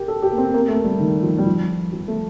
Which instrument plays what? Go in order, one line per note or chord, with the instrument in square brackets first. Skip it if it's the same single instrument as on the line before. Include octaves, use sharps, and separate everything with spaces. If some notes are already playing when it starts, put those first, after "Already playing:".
Already playing: [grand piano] G4 A#4
A4
G4
A#3
C4
A#3
A3
G3
D#3
F3
G3
F3
F3
A3